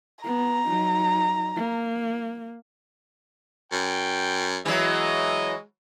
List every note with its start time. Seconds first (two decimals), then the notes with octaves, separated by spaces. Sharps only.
0.24 B3 A#5
0.66 F#3 D#4
1.56 A#3
3.72 F#2 G5
4.66 E3 F#3 G#3 D#5